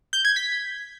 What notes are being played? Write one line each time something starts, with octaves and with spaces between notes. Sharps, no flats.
G6
G#6
B6